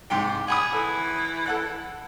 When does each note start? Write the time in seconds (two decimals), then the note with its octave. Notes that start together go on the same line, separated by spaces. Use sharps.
0.10 G#2 C3 G5
0.48 G#4 F#5 B5 D#6
0.73 E3 A4
1.46 A4 F#5 F#6